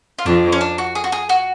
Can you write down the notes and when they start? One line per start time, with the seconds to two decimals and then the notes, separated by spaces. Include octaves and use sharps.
0.19 F4
0.26 F2 D4
0.52 C#4
0.61 D4
0.78 F#4
0.95 G#4
1.04 F#4
1.12 G#4
1.29 F#4